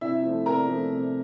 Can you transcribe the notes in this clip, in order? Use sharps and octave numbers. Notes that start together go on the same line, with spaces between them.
C3 E4 E5
F3 A3
C3 A#4 A#5
F3 A3
C3